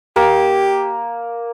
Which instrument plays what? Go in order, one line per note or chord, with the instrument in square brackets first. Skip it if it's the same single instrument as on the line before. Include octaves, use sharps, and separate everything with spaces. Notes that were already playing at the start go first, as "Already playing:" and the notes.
[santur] A#3 [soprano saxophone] G4